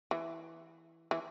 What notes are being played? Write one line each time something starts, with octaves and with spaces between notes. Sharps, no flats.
E3
E3